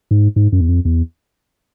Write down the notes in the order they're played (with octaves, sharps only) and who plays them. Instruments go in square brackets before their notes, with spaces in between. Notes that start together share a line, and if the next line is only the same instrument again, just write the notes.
[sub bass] G#2
G#2
F#2
E2
F2
E2